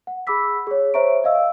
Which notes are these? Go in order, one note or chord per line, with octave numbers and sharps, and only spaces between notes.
F#5
G#4 B5 D6 E6 B6
G#4 C#5
C5 C#5 E5 A#5 C#6 D7
D#5 F5 E6